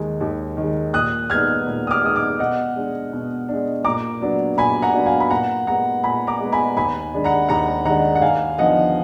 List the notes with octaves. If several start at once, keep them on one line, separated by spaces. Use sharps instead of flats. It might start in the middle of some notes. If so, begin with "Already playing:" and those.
Already playing: D#2 D#3 G#3
D#2
D#3
G#3
A#2 D#6 F#6
G#3 B3 D#4 F6 G#6
A#2
D#6
D6 F6
G#3 B3 D#4 D#6
D6 F6
B2 D#5 F#5
G#3 D4
B2
G#3 D4
A#2 A#5 D6
F#3 B3 D4
A#2 G#5 B5
F#5 A#5
F#3 B3 D4
F5 G#5
B5
A#2 F#5 A#5
G#3 B3 F#5 A#5
A#2 G#5 B5
A#5 D6
G#3 B3
G#5 B5
D#2 G#5 B5
D#3 G#3 D4
F#5 A#5
D#2 F#5 A#5
D#3 G#3 D4 F#5 A#5
F#5
D#2 F5 G#5
D3 F3 B3 D#4 D#5 F#5